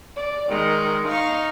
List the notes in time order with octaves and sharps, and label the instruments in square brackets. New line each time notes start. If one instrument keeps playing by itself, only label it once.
[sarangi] D5
[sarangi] D#3 [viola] G#3
[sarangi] D#4 [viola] F5 C#6